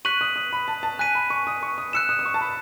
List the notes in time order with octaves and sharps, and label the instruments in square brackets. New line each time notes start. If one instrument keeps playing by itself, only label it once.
[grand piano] C#6 [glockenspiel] F#6 B6 D#7 F#7
[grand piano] D#6
D#6
B5
A5
A5
[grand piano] G#5 [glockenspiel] F#6 B6 D#7
[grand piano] B5
C#6
D#6
C#6
D#6
[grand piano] E6 [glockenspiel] F#6 C#7 E7
[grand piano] D#6
D#6
C#6
A5
B5